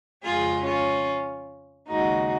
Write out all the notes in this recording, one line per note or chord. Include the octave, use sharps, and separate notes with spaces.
F2 C#3 F3 G#3 F4 G#4
C#4 F4
D#2 C#3 G#3 D#4 F#4